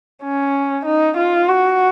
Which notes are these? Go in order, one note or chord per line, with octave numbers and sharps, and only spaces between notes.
C#4
D#4
F4
F#4